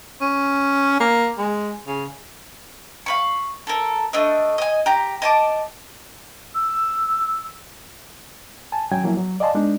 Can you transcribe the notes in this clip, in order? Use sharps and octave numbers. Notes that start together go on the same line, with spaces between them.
C#4
A#3
G#3
C#3
F5 B5 C#6
A4 A#4
A3 D4 D#5
D#5 G#5
G4 A#5
D#5 A5 D6
E6
G#5 A5
D#3 F#3 C#4 G5 G#5 G#6
F3 F#3 A#3 B3 E4
F#3
D5 D#5 F5 G#5 A5 C6
G#3 B3 D4 D#4